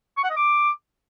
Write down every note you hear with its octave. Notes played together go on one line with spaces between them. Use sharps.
C#6
F#5
D#5
D6